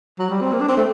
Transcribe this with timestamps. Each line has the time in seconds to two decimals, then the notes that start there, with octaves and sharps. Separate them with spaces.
0.19 F#3
0.30 G3
0.41 C4
0.52 A#3
0.61 D4
0.69 C4
0.77 A3